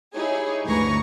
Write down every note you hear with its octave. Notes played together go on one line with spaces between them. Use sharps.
D#4 E4 G4 G#4 C#5
G1 D2 B4 G#5 A#5 C#6